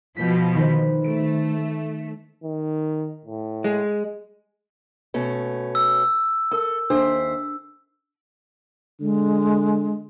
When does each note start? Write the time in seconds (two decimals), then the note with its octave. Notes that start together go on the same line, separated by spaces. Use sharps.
0.17 B2 F3 G5 B6
0.55 D#3 B4 C5
1.04 A3 D7
2.44 D#3
3.25 A2
3.64 G#3
5.14 B2 A3 C#4
5.75 E6
6.52 A4 A#4
6.90 D#2 D4 A4 C5 E5
9.01 D3 G#3